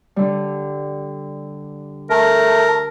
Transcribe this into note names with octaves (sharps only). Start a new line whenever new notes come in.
D3 G3
A3 A#4 A5